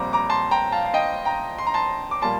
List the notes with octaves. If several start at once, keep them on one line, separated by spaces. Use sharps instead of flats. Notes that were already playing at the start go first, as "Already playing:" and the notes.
Already playing: A#1 A#2 G3 C4 A#5 D6
A#5 D6
A5 C6
G5 A#5
F5 A5
F5
D#5 G5
G5 A#5
C6
A#5
A5 C6
D6
A#2 G3 A#3 A5 C6